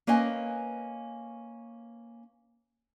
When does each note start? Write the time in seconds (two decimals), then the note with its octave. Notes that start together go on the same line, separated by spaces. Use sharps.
0.07 A#3 C#4 B4 D#5 G#5